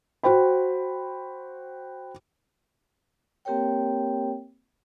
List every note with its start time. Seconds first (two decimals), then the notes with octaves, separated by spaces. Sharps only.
0.23 F#4 C5 G5 B5
3.45 A#3 C4 G4 A#4 C#5 G5